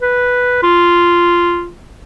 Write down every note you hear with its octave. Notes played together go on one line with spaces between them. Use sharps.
B4
F4